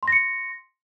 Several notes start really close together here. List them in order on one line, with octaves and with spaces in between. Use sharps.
C6 A#6 C#7